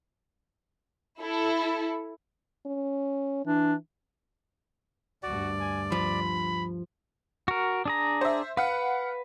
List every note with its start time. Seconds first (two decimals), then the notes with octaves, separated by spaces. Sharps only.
1.20 E4 A4
2.66 C#4
3.46 E3 D4
5.23 D2 G2 F#4 D5
5.60 G#5
5.92 F3 B5
7.48 F#4 A#4
7.86 D4 G#4 A#5
8.21 C5 E5
8.57 B4 F5 F#5